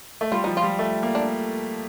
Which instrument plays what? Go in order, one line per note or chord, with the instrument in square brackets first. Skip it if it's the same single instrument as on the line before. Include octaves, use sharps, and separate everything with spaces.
[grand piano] A3
[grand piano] G3 [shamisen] F4
[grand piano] F3 [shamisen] D#4
[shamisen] F4
[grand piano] G3
A3
A#3
[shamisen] D4